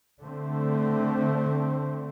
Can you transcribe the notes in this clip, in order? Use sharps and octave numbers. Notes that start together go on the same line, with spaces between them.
D3 A3 C4